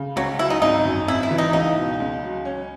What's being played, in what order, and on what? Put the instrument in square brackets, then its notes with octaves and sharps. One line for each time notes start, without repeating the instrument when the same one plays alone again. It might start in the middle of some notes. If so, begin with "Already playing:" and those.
Already playing: [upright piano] C#3
[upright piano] C#2 [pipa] F#3
[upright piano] F#3 [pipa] E4
[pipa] D#4
[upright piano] G#1 [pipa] D#4
[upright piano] F#2
[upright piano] G#1 [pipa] E4
[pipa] E4
[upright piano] E3
[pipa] D#4
[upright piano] C#2 [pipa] D#4
[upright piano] B2
C#2
F#3
C#4